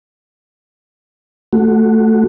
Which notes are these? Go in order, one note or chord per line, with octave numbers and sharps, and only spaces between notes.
A3 F#4